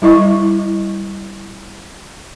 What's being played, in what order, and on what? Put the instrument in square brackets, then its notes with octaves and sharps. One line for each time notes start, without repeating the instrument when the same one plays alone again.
[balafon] G3 E4 D#5 C#6